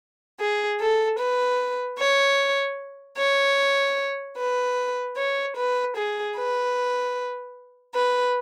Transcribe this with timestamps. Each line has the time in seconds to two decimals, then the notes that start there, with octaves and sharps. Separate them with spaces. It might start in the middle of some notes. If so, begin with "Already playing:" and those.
0.39 G#4
0.79 A4
1.18 B4
1.98 C#5
3.17 C#5
4.36 B4
5.17 C#5
5.56 B4
5.95 G#4
6.36 B4
7.94 B4